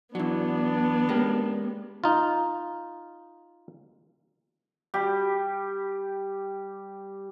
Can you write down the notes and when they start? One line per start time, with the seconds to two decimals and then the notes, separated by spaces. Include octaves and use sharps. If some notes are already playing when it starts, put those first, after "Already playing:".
0.15 E2 F#3 B3 D4 E4 F#4
1.09 G#3 A#3 C#4 G4
2.04 D#4 F4
4.94 G3 G4